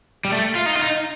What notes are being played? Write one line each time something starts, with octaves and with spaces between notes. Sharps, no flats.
G3
A3
F4
D#4
F4
D#4